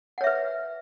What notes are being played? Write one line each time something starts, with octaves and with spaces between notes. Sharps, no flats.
B4 C#5 E5 F#5